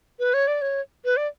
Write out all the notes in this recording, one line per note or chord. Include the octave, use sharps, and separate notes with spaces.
B4
C#5
D5
C#5
B4
D5